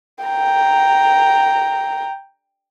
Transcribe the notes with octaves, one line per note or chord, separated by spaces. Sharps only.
G5 A#5